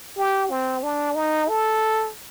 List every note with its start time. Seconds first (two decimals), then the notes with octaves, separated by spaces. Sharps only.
0.17 G4
0.50 C4
0.83 D4
1.15 D#4
1.49 A4